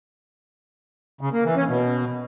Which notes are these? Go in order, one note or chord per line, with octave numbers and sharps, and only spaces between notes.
C#3
A#3
E3
C#4
B2